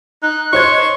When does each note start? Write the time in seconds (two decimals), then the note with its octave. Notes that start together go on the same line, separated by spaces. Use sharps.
0.23 D#4 F#6
0.53 D#4 C5 C#5 C#6 G#6